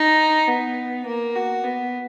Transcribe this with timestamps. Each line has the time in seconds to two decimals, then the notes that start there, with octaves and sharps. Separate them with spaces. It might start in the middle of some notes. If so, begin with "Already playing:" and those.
Already playing: D#4
0.47 B3
1.06 A#3
1.35 F#4
1.64 B3